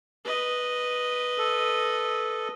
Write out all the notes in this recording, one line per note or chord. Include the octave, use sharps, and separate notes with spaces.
B4 D#5
A4